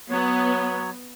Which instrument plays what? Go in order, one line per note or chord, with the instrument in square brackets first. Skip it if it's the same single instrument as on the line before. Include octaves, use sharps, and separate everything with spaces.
[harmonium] F#3 C#5 [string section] B3